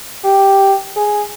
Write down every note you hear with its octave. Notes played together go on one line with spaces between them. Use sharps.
G4
G#4